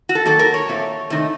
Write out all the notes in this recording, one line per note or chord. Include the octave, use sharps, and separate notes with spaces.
F#4
A4
D#3 F#3 A#3 A4
A#4
C#5
A#2 A3 C4
C3 D#3 A3 D#4